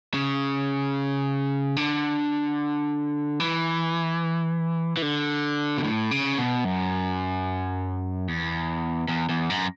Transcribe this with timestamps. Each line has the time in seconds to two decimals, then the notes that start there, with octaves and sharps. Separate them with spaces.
0.14 C#3
1.77 D3
3.40 E3
4.97 E3
5.02 D3
5.78 B2
5.84 A2
6.11 C#3
6.38 B2
6.65 F#2
8.28 E2
9.08 E2
9.29 E2
9.50 F#2